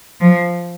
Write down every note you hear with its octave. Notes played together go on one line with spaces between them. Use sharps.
F3